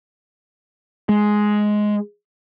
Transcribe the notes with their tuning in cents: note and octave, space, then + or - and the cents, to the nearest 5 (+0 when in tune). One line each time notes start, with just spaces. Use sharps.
G#3 +10